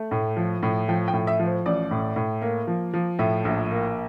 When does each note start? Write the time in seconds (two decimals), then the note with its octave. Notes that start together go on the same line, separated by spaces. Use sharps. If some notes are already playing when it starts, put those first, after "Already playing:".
Already playing: A3
0.11 A2
0.37 F3
0.63 A2
0.88 F3 G5
1.08 G5
1.13 A2
1.27 E5
1.40 F3
1.46 C5
1.66 A1 D5
1.91 A2
2.16 A2
2.42 A#3
2.67 F3
2.94 F3
3.19 A2 E5
3.45 A#1
3.71 A#3